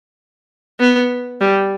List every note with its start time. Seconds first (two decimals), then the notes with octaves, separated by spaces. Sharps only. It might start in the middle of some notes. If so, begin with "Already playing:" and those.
0.80 B3
1.41 G3